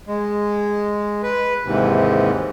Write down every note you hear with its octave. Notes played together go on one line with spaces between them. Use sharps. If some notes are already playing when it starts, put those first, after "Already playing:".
G#3
B4
D#2 G#2 C3 E3